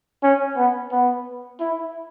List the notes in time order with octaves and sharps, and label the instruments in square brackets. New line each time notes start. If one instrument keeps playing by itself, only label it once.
[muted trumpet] C#4
B3
B3
E4